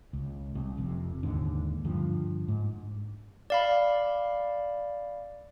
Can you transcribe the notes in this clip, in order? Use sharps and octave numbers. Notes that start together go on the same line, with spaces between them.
C#2
C2
F1 F2 C3
D#1 D#2 G#2 D3
G2 D3 F3
G#2
D5 F5 B5